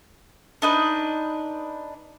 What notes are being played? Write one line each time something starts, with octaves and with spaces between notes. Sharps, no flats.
D4 D#4 B4